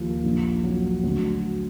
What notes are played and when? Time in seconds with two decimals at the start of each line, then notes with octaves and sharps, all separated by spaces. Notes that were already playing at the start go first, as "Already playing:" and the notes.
Already playing: D#2 F3
0.24 A#1
0.64 F#3
1.03 D2